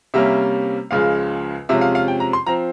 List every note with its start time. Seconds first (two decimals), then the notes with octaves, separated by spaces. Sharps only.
0.14 C3 G3 A#3 C#4 E5
0.91 C#2 C#3 F3 G#3 F5
1.69 C3 F3 G#3 C#4 E5
1.81 F5
1.95 F5
2.08 G5
2.20 A#5
2.33 C6
2.47 F3 C4 A#5